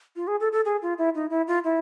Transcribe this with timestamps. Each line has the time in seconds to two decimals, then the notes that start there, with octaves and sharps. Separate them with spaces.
0.16 F4
0.27 G#4
0.40 A4
0.52 A4
0.65 G#4
0.82 F4
0.98 E4
1.15 D#4
1.30 E4
1.47 F4
1.64 E4